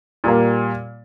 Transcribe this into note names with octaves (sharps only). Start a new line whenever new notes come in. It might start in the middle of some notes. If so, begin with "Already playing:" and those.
A#2 G3 A#3